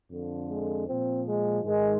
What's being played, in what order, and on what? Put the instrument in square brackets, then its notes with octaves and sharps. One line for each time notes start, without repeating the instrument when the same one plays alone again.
[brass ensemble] F2 D3 F3
G#3
A#2 F3 C4
G#3
G#2 D#3 G#3